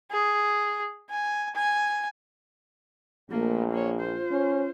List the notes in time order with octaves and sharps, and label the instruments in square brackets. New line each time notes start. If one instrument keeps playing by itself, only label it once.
[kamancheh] G#4
G#5
G#5
[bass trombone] A#1 [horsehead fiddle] A3 A#3
[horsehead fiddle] A#3 C#5
F4 C5
[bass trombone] C#4